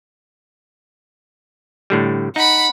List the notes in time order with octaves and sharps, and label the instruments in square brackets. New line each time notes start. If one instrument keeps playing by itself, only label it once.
[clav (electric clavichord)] A2 D3 G3
[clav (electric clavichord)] D#4 [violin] F#5 B5